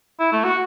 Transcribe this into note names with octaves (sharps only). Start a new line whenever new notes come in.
E4
A3
F#4